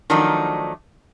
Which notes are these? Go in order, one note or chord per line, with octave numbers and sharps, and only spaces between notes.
D#3 F3 F#3 A3 D4 D#4